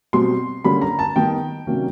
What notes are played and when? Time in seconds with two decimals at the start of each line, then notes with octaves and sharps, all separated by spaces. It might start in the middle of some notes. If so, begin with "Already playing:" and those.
0.13 B2 G3 C4 C6
0.65 D3 G3 A#3 C#4 B5
0.81 A#5
0.99 A5
1.16 D#3 G3 B3 G5
1.67 C3 D#3 F#3 A#3 C#4